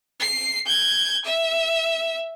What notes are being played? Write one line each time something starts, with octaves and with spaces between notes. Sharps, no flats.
C7
G6 G#6
E5